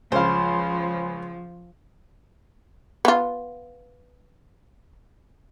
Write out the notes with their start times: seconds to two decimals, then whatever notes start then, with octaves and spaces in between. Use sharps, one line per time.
0.12 C#2 F3 C5 F5 G#5 B5
3.05 B3 F4